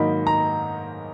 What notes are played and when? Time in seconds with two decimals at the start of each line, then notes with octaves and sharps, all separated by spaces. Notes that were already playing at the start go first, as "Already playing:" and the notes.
Already playing: G#2 D#3 F#3 A#3 D#4 B5
0.27 A#5